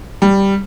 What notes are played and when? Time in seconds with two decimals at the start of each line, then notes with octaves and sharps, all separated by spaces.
0.22 G3